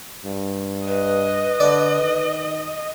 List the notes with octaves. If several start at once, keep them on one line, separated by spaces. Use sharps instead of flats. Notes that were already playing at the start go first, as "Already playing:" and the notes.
G2
B4 D#5
D3 D5
D#3